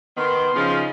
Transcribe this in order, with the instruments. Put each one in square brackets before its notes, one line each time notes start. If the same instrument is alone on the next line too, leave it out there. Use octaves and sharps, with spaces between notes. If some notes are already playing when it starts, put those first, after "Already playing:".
[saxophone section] D#3 [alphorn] B3 [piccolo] C6
[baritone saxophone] C#3 [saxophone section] F3 [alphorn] D#4